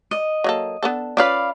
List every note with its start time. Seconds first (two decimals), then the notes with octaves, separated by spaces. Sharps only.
0.11 D#5
0.44 F#3 A#3 A4
0.83 B3 D4 A4
1.17 C#4 F4 B4 D5 F5 B5